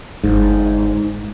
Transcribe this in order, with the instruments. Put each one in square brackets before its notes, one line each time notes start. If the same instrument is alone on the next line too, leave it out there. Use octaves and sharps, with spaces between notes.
[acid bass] G1 [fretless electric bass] G#2